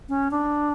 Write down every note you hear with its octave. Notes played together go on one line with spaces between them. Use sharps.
C#4
D4